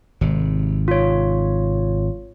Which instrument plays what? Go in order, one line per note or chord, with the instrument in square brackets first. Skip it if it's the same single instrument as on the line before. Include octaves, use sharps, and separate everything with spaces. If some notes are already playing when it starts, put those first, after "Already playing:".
[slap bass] G#1 C3
[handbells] F4 C#5